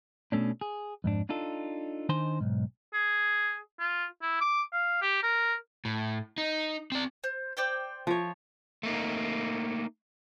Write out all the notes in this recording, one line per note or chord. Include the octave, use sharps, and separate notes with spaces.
B2 E3 A3 C#4 D4
G#4
F2 G#2 D4
D4 D#4 F4 A4
D#3 D4 D#4 C5 G#5 C6
B1 G#2
G#4
F4
E4
D6
F5
G4
A#4
A2
D#4
C4 D5
C5
C5 D5 G5
F3 C#5
A3 A#3 D#4